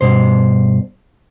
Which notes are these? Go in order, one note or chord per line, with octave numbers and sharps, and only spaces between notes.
G2 B2 C5